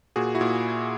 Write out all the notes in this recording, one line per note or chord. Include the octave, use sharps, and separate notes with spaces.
A#2 F#4 G#4
E4 F#4
A#2